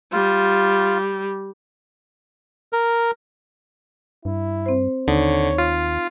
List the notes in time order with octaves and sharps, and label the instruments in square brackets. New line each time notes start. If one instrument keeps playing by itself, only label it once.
[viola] G3 [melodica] F4
[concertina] A#4
[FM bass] G2 [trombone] E4
[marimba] C4 C5
[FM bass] D#2 [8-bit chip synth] D3 [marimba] D#4 [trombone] C#5
[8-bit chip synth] F4